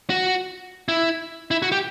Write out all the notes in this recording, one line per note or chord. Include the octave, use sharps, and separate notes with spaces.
F#4
E4
E4
F#4
G4